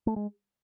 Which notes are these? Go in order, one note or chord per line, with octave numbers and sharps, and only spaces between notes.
A3
G#3